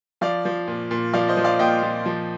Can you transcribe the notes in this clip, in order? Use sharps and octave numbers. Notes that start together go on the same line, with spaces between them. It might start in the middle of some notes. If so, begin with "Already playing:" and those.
F3 D5 F5
F3
A#2
A#2
F3 D5 F5
C5 D#5
F3
D5 F5
A#2 D#5 G5
A#2
F3